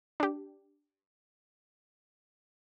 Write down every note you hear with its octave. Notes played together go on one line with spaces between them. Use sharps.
D4 G4